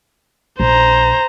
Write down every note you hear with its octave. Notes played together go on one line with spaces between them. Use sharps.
A#1 C5 A#5